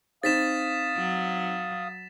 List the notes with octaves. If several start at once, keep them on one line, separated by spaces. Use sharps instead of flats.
C4 D#4 F5 D#6 A6 B6 E7
F#3